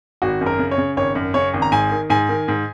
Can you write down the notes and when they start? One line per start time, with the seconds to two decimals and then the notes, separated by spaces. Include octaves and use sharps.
0.22 G#1 F#4
0.41 F#2
0.46 A#4
0.59 C#3
0.71 C#5
0.78 C#3
0.97 G#1 C#5
1.15 F#2
1.34 C#3 C#5
1.54 G#1
1.62 A#5
1.72 G#2 G#5
1.91 D#3
2.10 G#2 G#5
2.29 D#3
2.48 G#2